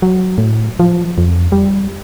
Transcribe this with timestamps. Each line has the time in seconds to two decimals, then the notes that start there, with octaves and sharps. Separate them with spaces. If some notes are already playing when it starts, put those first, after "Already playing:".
0.02 F#3
0.38 A2
0.80 F3
1.18 F2
1.52 G3